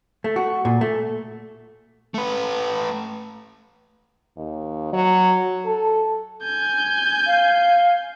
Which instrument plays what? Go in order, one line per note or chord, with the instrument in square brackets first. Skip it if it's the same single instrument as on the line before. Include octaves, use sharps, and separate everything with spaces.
[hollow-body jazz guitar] A3
F#4
A#2
A3
[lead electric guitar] A3 B4
[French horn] D#2
F#3
A4
[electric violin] G#5 G6
[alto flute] F5